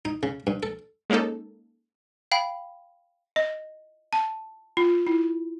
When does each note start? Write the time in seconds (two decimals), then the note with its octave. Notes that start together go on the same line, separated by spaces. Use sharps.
0.05 D#4
0.23 C#3
0.47 G2
0.63 A4
1.10 G#3 A#3 C#4 D#4 A4
2.32 F5 G5 B5
3.36 D#5
4.13 A5
4.77 F4
5.07 E4